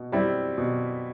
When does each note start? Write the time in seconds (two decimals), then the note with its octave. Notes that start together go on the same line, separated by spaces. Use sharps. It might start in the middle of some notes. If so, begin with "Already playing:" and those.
Already playing: B2
0.12 G3 C4 E4
0.58 B2